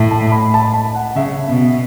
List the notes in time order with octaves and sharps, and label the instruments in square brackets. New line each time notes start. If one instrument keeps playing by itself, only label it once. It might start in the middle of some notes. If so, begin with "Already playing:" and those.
Already playing: [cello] A2 [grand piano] A5
[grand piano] A5
B5
A5
A5
F#5
[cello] C#3 [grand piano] E5
[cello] B2 [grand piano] E5